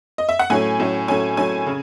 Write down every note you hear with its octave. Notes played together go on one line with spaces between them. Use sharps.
D#5
E5
F#5
A2 F#3 A3 C#4 G#5
A2 F#3 A3 C#4
A2 F#3 A3 C#4 G#5
A2 F#3 A3 C#4 G#5
C#3